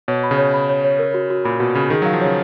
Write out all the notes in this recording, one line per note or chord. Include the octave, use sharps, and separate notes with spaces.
B2 C#5
B5
C#3
C#5
B5
C#5
C#5
A#4
F#4
F#4
A#2 B5
B2 F#4
C#3 B5
D#3 G#4
F#3 F5
F3
C#3 C#5